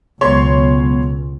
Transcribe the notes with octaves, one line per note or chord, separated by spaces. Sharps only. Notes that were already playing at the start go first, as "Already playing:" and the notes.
C#2 B2 F#3 G#3 B3 C#5 C6